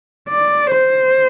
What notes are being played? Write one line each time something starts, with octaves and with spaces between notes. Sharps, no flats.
D5
C5